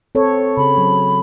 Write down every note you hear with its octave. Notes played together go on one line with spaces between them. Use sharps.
C4 A4 C#5
C#3 G#4 B5
F#3